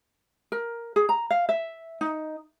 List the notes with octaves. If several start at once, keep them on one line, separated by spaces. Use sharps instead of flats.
A#4
G#4
A#5
F5
E5
D#4